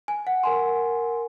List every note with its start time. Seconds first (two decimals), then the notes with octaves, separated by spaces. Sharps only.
0.08 G#5
0.27 F#5
0.43 A#4 G#5 C6